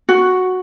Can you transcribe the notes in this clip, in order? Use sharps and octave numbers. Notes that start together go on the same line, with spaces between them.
F#4